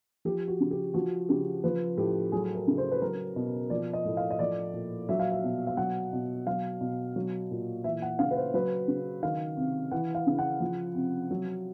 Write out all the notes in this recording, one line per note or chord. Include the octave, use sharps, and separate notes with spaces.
F3 G4
F#4
C#3
G4
F3 F#4
C#3 G4
F3 B4
A2 G4
F#3 G#4
A#4
C#3
C5
B4
F#3 A#4
B2
F3 D5
D#5
A2
F5
D#5
F3 D5
A#2
F#3 E5
F5
E5
B2
F5
F#3 F#5
B2
F#3 F5
B2
F#3
A#2
E3 E5
F#5
C#3 F5
B4
C5
F#3 B4
C#3
D#3 F5
C3
E3 F#5
F5
C#3
F#5
F3
C3
F#3